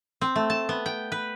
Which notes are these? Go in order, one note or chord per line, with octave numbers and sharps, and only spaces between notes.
C4
A3
A5
B3
G5
B4